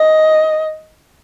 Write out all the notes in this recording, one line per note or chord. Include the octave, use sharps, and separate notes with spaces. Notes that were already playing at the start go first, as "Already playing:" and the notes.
Already playing: D#5